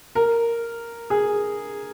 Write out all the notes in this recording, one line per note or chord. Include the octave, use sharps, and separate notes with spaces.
A#4
G#4